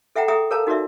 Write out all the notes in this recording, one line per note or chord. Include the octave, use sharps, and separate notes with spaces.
A4 E5 F#5 G5 A#5
G#4 A4 E5 G5 A#5 D#6
A4 A#4 C#5 F5 A5 A#5
D#4 F#4 A#4 D5 E5